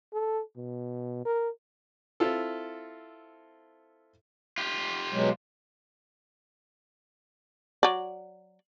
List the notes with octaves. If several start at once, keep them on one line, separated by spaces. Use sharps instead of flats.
A4
B2
A#4
C4 E4 F4 A4
F4 G4
B2 F#3 G#3
F#3 D5